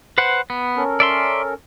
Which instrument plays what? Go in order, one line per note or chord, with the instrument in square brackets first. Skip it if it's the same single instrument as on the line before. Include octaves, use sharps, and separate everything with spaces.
[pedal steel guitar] B4 C5 F#5
B3
[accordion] C#4 A4 A#4
[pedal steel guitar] D5 E5 C6